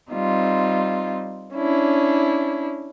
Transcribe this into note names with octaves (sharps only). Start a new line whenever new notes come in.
G3 C4 D#4 F4
C#4 D4 E4